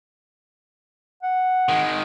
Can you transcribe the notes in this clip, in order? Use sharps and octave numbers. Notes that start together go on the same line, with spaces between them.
F#5
D#3 G#3